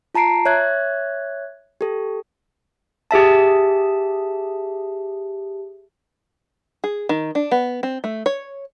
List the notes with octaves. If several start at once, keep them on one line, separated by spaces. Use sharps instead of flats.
F4 A5 A#5 C7 D7
C#5 E5 F#6 G#6
G4 A4
G4 G#4 E5 A5
G#4
D#3
D4
B3
C4
A3
C#5